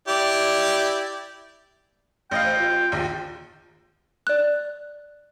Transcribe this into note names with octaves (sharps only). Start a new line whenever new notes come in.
E4 G4 D5
A1 D#5 F5 G5
C5
F4
A#1 D#2
D5 F#6